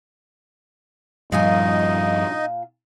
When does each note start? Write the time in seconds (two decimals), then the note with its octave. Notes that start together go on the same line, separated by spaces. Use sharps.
1.32 G2 A#2 F3 G3 D#4 F4 D#5 G#5